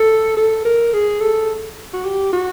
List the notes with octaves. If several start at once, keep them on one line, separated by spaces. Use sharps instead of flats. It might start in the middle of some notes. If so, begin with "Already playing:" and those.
Already playing: A4
A4
A#4
G#4
A4
F#4
G4
F#4